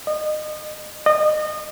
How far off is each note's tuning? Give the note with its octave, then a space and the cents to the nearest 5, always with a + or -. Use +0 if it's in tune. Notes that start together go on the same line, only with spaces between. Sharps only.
D#5 -30
D#5 -30